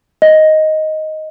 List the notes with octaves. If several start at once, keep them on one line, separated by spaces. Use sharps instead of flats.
D#5